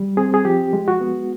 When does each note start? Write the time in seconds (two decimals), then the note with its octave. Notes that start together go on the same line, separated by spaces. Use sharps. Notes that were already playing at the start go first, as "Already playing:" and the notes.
Already playing: G3
0.17 C4 G#4
0.34 G#4
0.45 F3 G4
0.73 G#3
0.88 F#4
1.01 B3